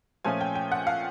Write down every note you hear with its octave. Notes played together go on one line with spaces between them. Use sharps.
A#2 F3 A3 C#4 F4 G#5
G5
G5
F#5
F5